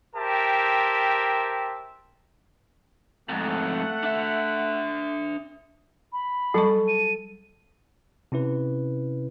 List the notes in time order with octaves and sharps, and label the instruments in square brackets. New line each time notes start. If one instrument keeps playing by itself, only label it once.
[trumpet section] G4 A#4 C5 E5 G5 A5
[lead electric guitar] F2 G#2 [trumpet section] A3 F#5
[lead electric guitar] D4 E5
[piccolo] B5
[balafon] F#3 G3 C#6 [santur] A4
[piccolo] D#7
[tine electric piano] C3 C#4 E4 B4